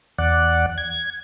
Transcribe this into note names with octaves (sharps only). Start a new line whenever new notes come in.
E2 D5 F#5
G#6